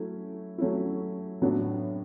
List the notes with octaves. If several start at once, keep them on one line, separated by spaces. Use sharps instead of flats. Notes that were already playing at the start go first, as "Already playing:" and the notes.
Already playing: F#3 A3 C#4 E4
F#3 A3 C#4 E4
A2 F#3 B3 D4